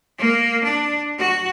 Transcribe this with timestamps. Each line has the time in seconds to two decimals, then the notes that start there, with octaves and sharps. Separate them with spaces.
0.19 A#3
0.64 D4
1.19 F#4